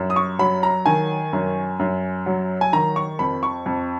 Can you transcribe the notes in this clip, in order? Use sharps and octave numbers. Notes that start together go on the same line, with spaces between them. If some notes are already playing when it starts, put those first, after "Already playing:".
Already playing: F#2
D#6
C#6
F#3 B5
A#5
D#3 G#5
F#2
F#2
F#3
G#5
D#3 A#5
C#6
F2 B5
C#6
F2